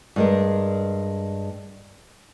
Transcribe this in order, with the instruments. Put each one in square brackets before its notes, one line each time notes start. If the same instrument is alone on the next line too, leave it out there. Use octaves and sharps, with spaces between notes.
[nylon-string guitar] G2 G#3 A#4